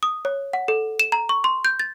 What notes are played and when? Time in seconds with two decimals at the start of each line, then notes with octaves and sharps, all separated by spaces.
0.03 D#6
0.25 C#5
0.53 F#5
0.68 A4
1.00 E7
1.12 A#5
1.29 C#6
1.44 C6
1.65 G6
1.79 A6